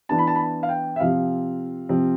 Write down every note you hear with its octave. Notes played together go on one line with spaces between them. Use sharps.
E3 B3 D4 A5
B5
A5
B5
A5
F5
G5
E5
C3 F3 C4 F5
C3 F3 C4